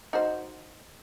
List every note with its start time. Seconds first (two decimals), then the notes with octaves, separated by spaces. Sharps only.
0.13 D#4 F#4 C5